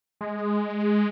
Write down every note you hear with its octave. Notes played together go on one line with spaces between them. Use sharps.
G#3